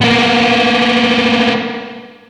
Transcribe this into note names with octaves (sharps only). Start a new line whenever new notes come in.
A#3 B3